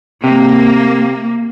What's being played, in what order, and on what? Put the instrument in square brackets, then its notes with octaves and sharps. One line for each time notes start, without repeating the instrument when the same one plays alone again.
[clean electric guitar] C3 [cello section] A#3